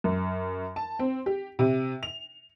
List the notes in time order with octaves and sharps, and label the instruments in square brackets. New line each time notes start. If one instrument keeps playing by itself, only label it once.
[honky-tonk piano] F#2
A5
C4
G4
C3
F7